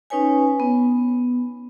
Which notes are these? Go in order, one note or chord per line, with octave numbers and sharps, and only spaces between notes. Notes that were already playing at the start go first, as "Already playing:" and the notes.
C#4 D#4 B4 C#5 G#5
B3